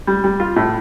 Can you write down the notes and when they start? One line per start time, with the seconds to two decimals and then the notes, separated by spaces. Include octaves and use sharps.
0.07 G3
0.24 G3
0.40 F4
0.56 A2